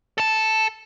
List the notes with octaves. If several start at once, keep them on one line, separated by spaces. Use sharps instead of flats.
A4 A5